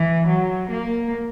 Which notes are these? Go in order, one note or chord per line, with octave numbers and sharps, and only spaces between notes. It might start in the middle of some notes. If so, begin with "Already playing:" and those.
Already playing: E3
F#3
A#3